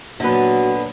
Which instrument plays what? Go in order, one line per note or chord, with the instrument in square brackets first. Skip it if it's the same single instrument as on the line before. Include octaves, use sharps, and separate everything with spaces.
[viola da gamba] A#2 F#3 [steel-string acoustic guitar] D3 B3 B4 [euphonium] F#4